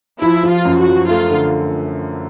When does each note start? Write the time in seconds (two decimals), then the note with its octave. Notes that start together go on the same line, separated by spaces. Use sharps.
0.22 F3 E4
0.43 F3
0.50 F4
0.65 F#2
0.80 F#4
0.87 F3
1.08 A3 F4
1.30 D3